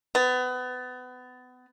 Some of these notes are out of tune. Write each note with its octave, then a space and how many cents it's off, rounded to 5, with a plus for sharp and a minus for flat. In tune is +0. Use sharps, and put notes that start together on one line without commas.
B3 +30